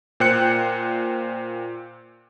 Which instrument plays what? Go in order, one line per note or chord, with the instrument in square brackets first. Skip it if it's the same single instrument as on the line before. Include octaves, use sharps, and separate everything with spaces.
[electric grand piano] A#2 C5 G5 F#6 C#7